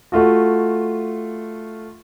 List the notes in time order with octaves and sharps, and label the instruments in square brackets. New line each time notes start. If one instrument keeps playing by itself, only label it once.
[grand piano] A3 F4 F#4